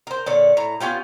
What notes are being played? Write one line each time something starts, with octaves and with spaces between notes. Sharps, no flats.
A#4 C5
A#2 D3 C#5 D5
A2 A#5
B3 C#4 F4 G4